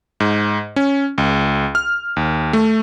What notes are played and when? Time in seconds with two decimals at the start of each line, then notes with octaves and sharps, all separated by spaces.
0.20 G#2
0.76 C#4
1.18 C#2
1.75 F6
2.16 D#2
2.53 A3